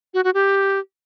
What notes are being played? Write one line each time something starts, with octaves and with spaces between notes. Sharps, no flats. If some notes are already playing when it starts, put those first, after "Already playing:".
F#4
F#4
G4